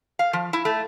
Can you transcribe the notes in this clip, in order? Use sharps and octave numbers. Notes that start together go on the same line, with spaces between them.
F5
F3
E4
A3